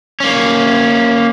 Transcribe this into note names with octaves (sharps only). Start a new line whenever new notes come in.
A#3 C#4